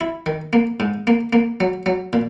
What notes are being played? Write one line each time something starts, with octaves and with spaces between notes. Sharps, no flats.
E4
D#3
A#3
G#2
A#3
A#3
F#3
F#3
A#2